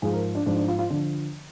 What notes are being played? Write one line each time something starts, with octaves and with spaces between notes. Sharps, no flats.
G#2 F3 G#4
A#4
D4
G#2 F3 D4
D4
F4
F4
D3 F3 D4